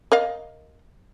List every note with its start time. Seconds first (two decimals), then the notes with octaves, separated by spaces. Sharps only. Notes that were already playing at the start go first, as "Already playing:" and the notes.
0.12 A#4 D#5 F5